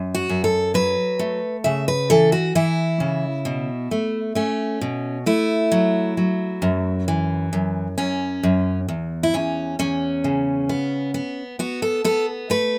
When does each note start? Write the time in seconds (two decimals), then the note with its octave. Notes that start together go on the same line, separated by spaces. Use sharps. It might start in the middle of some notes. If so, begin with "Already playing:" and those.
Already playing: F#2
0.15 F#4
0.29 F#2
0.44 A4
0.74 F#3 B4
1.19 A3
1.64 C#3 E5
1.88 B4
2.10 E3 A4
2.32 F#4
2.55 E3 E4
3.00 C#3
3.45 B2
3.91 A3
4.35 A3 C#4
4.81 B2
5.26 A3 E4
5.72 F#3
6.17 F#3
6.62 F#2
7.08 E3
7.53 F#2
7.98 F#2 C#4
8.43 F#2
8.89 E2
9.23 E4
9.34 E2 C#4
9.79 E2 C#4
10.24 C#3
10.69 B3
11.14 B3
11.59 B3 F#4
11.82 A4
12.04 B3 A4
12.50 A3 B4